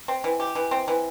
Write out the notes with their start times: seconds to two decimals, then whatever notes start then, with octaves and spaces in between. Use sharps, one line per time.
0.08 C4
0.24 E3
0.40 G4
0.55 E3
0.71 C4
0.88 E3